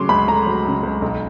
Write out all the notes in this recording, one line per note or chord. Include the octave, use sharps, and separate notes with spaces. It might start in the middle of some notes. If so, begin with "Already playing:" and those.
Already playing: C#3 F#3 A3 C6 D6
C#2 B5
A3 A#5
F#3
C#3
C#2
B1